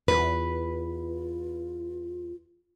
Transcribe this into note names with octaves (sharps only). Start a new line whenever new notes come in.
E2 F4 B4